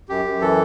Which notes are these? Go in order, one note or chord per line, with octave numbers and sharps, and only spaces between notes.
F#2 G4
F#2
E3 A4